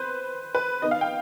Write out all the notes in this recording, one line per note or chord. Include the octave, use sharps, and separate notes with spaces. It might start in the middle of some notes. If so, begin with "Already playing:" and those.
Already playing: C4 B4 C5
B4
D#3 B3 D#4 D#5
F5
G5